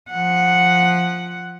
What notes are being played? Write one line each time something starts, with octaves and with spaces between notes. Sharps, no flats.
F3 F#5